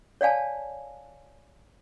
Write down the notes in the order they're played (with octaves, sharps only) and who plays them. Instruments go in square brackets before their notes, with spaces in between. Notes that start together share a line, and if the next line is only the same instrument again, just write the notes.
[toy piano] C#5 D5 F5 G#5 A5